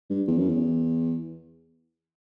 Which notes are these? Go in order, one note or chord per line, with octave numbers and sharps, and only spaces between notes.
G2
E2
F#2
E2